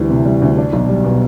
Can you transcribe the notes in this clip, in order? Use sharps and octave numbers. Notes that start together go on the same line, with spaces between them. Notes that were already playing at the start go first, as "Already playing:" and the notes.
Already playing: D2 E3 G3
C3
G3
D2
D4
B1
G3
B2